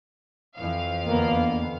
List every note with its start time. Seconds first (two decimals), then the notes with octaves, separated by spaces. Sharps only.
0.57 F2 E3 F5
1.05 E2 D3 A#3 B3